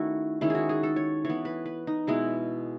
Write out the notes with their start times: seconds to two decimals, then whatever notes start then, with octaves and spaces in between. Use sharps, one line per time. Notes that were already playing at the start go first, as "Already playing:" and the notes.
Already playing: D#3 A3 C#4 E4 F#4
0.41 D#3 G#3 C#4 E4
0.50 F#4 G#4
0.69 G#4
0.83 A4
0.96 C#5
1.25 E3 B3 C#5
1.45 B4
1.66 B4
1.87 D#4
2.07 B2 G#3 B3 E4